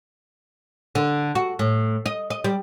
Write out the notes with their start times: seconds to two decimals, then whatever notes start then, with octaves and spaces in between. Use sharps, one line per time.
0.95 D3
1.35 F#4
1.59 A2
2.06 D#5
2.30 D#5
2.44 G3